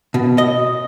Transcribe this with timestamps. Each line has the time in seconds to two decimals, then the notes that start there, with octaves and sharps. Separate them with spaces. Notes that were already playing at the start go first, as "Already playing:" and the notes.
0.14 B2
0.38 D#5